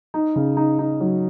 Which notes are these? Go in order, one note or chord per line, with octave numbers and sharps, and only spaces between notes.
D#4
C#3
D#4
D#4
F#3